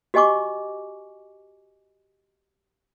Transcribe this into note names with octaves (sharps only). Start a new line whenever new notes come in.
F#4 G4 D#5 G#5 C#6 D6